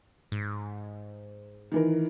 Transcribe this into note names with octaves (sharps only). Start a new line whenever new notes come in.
G#2
D#3 E3 A#4